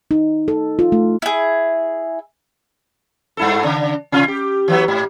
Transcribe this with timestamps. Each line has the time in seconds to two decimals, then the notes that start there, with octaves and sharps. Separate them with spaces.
0.11 D#4
0.48 A4
0.79 F4
0.92 A3
1.22 E4 G#4
3.37 G2 E4 A4
3.64 C#3 D4
4.12 C3 F4
4.28 G4
4.68 E3 F#3 B3
4.88 G#2